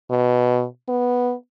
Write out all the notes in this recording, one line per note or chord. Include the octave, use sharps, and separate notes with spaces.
B2
B3